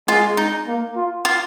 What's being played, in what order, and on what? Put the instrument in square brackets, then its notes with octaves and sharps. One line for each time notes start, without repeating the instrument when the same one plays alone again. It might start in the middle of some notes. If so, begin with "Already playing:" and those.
[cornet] G#3 [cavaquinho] F4
[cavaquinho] D#4
[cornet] A#3
F4
[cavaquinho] F4